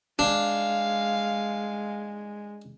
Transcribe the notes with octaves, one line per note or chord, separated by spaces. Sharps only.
G#3 D4 F5